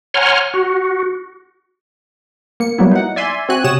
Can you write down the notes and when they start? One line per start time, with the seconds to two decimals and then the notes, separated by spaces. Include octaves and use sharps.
0.14 C#5 F#5 G#5 A#5 C6 F6
0.54 F#4
2.60 A#3 C#7
2.78 F#3 G3 A#3 B3 E4
2.92 D#4 F#5
3.16 D5 E5 G#5 C6
3.49 C4 F#4 G#5 F#6
3.64 C3 C#5 D#6 E7